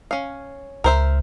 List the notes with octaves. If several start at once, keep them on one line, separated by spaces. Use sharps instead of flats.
C#4 F5
C#2 A#4 C5 E5